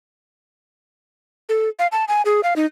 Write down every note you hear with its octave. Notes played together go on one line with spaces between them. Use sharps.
A4
F5
A5
G#5
G#4
F5
D#4